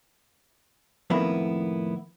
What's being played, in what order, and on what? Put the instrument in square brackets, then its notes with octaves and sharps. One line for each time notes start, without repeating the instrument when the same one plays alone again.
[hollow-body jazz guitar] F2 A2 D#3 A#3 B3 E4